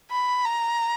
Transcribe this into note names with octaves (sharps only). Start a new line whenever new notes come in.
B5
A#5